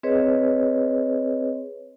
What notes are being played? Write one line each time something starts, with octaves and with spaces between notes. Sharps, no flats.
C4 G#4 B4 C#5 D#5